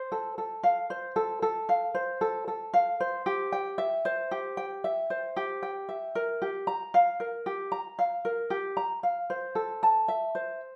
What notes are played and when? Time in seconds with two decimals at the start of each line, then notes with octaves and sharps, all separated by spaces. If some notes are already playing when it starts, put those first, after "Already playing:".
Already playing: C5
0.12 A4
0.38 A4
0.63 F5
0.90 C5
1.16 A4
1.42 A4
1.69 F5
1.95 C5
2.21 A4
2.48 A4
2.74 F5
3.00 C5
3.26 G4
3.52 G5
3.78 E5
4.05 C5
4.31 G4
4.57 G5
4.84 E5
5.10 C5
5.36 G4
5.63 G5
5.89 E5
6.15 A#4
6.42 G4
6.67 A#5
6.94 F5
7.20 A#4
7.46 G4
7.72 A#5
7.99 F5
8.25 A#4
8.50 G4
8.77 A#5
9.03 F5
9.30 C5
9.55 A4
9.83 A5
10.08 E5
10.35 C5